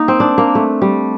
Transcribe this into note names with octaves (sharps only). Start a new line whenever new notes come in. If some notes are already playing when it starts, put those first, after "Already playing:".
Already playing: A#3 D#4
C4
D4
A#3
A3
G3